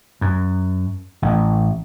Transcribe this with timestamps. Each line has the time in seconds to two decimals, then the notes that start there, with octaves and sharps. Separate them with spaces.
0.21 F#2
1.22 A1